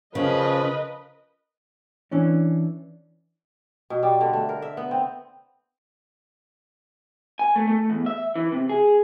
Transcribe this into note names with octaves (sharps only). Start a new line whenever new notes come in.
C#3 F3 A#4 B4 D#5
E3 C#4 D4
B2
G3
D3
A3
A#4
E5
B3
C4
G#5
A3
A3
E2
E5
E3
C3
G#4